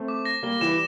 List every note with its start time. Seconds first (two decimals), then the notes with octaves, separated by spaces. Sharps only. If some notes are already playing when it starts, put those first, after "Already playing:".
Already playing: A3 C4
0.08 D6
0.25 A#6
0.43 G3 A#3 G7
0.61 E3 G3 E7